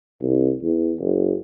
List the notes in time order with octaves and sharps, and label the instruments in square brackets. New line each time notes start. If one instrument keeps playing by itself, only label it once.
[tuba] C2
E2
F#1